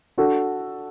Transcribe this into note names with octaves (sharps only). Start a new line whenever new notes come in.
D4 F#4 A4